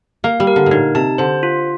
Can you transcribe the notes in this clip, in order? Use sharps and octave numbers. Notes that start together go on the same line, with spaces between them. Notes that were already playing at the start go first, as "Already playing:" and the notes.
A#3 F5
G3
A#4
D3
A2
A#2 D#4
C3 A5
D3 C5
F4